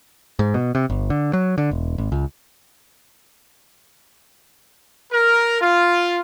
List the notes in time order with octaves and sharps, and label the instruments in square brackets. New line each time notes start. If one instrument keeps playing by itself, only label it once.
[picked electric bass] G#2
B2
C3
G1
D3
F#3
D3
E1
G#1
C#2
[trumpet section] A#4
F4